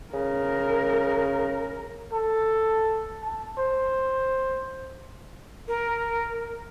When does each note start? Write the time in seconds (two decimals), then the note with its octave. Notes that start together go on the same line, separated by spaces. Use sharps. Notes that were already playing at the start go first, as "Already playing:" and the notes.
0.14 C#3 A#4
2.13 A4
3.23 A5
3.58 C5
5.68 A#4